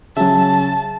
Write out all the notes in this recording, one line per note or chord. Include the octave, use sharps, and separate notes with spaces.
C#3 F#3 E5 A5